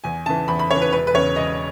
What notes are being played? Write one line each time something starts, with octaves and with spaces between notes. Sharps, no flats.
E2 G#5
C#3 E3 A5
E2 B5
B5
C#3 E3 C#5
B4
E1 B4
B4
E2 C#3 C#5
E1 D#5